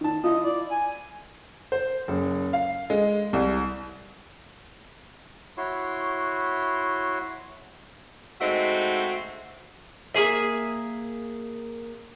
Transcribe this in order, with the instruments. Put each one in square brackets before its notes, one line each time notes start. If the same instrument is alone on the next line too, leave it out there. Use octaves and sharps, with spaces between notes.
[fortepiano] D#3 A5
[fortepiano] E4 F4 [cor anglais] D#5
[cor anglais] D5
G#5
[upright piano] C5
F#1
F5
G#3
C2
[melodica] E4 F#4 C#5 C6
[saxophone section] G#3 A3 C4 D#4 F#4
[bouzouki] A#3 G4 G#4 E5